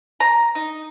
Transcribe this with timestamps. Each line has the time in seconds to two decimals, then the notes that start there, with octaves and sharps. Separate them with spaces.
0.20 A#5
0.55 D#4